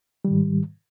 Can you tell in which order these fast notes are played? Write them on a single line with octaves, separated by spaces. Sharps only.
G3 D#3 G#2